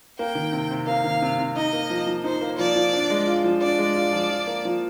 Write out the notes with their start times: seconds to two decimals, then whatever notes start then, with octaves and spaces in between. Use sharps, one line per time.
0.19 A#3 G5
0.35 D#3
0.52 C3
0.71 C3
0.87 A#3 F5
1.04 D#3
1.22 C3
1.39 C3
1.56 D#4 D#5
1.73 A#3
1.90 F3
2.07 F3
2.24 D#4 C5
2.41 A#3
2.58 F3 D5
2.76 F3
2.93 D4
3.10 G#3
3.27 F4
3.44 F3
3.62 D4 D5
3.78 G#3
3.96 F4
4.13 F3
4.30 F4
4.47 A#3
4.65 F3